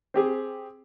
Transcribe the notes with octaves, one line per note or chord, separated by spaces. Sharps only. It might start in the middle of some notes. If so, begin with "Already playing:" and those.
C4 G4 G#4